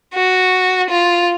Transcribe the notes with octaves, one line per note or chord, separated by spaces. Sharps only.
F#4
F4